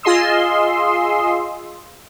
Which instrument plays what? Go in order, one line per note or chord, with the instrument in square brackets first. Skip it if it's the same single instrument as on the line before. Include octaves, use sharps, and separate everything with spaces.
[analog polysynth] F4 G#4 D#5 C6 D#6 E6